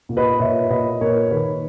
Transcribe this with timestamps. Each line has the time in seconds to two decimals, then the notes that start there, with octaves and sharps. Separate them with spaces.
0.09 A#2
0.17 B4 D#5
0.40 A#2 C#5 E5
0.70 A#2 B4 D#5
1.01 A#2 A#4 C#5
1.31 D#3 B4